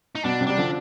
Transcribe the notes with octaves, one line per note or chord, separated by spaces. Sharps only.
D#4
B2 D4
C3
G3 D4
D3 F3